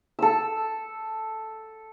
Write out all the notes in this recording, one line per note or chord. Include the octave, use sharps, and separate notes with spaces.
A4 E6